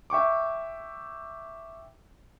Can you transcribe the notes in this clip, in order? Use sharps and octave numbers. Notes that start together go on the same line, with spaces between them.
E5 G5 C#6 D6